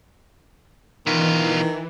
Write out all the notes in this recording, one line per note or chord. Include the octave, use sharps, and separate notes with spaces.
B2 D#3 E3 F4